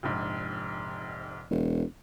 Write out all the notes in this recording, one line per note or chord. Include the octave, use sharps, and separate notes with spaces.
F1 A#1 G#2
E1